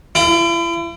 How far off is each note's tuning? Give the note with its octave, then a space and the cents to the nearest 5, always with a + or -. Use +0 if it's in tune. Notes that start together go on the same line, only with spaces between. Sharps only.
E4 +40